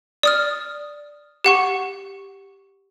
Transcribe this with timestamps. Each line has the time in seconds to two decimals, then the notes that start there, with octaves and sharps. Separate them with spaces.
0.23 D5 D#6 F6
1.44 G4 F#5 C#6